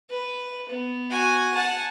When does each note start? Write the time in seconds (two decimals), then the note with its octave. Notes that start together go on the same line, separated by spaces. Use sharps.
0.10 B4
0.69 B3
1.10 F#4 G#5
1.55 F#5 G#5 A5